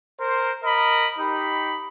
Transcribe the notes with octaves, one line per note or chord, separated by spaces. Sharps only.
A#4 C5
A#4 D#5 B5
D#4 G4 B5